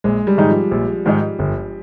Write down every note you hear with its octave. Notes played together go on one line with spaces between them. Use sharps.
A#1 G#3
G3
G#2 D#3 G#3 D#4
F3
A#1
G#2 D#3 G#3 D#4
G1